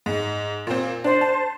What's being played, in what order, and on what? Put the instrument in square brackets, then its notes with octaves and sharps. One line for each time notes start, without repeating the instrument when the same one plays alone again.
[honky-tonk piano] G#2
A#2 C4
[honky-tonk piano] D4 [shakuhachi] C5
[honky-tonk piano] A5